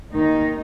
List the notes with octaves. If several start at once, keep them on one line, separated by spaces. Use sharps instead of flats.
D#2 D#3 D#4